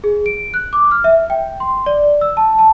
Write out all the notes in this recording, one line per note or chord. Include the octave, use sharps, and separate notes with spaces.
G#4
D7
F#6
D6
F6
E5
G5
C6
D5
E6
A5
A5